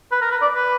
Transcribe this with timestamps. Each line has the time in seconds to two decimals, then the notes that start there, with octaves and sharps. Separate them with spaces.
0.12 B4
0.21 A#4
0.31 B4
0.42 D5
0.55 B4